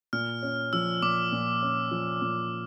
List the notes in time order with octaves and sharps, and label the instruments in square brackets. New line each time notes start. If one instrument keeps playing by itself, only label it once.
[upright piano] A#2 [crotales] F6
[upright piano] C#4
[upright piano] F3 [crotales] E6
[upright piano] A#2 [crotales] D6
[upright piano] A#2
C#4
F3
A#2